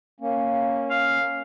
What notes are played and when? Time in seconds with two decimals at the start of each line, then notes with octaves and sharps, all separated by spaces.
0.20 A#3 C#4
0.90 F5